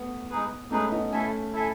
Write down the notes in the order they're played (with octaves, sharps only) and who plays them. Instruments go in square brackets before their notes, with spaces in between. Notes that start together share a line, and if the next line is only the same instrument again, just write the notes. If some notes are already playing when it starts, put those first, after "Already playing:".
Already playing: [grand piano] A3 B3
[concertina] G#3 D#4 G#4 B4
[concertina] G#3 D#4 G#4 B4 [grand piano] A3 C#4
[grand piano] B3 D#4
[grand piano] A3 C#4 [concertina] E4 A4 E5 G#5
[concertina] E4 A4 E5 G#5